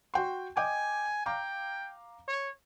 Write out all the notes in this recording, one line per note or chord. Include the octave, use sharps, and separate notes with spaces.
F#4 G5 C6
D#5 G5 G#5 D6
F5 G5 A#5 D6
C#5